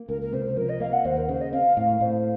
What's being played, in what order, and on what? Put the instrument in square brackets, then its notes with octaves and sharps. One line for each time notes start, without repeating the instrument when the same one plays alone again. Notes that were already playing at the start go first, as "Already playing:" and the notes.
Already playing: [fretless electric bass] A#3
[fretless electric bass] C#2 [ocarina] A#4
[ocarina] A#4
[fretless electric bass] C3 [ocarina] C5
[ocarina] C5
[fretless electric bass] F3 [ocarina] A#4
[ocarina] D#5
[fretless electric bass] A#3 [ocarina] F5
[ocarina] F#5
[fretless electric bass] D#2 [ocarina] C5
[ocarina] A#4
[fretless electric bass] C#3 [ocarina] C5
[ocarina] D#5
[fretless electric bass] C4 [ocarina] F5
[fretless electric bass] A2 [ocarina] F5
[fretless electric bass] A2 [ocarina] C5